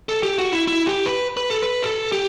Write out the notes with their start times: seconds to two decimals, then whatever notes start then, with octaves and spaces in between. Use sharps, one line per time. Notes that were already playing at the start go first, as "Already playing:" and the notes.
0.09 A4
0.23 G4
0.38 F#4
0.52 E4
0.68 E4
0.86 G4
1.06 B4
1.37 B4
1.50 A4
1.62 B4
1.83 A4
2.12 G4